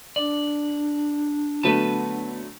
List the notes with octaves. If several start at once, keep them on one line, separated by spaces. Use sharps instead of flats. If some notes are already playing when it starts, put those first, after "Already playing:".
D4 D5
D3 F#3 A3 B3 B4 A5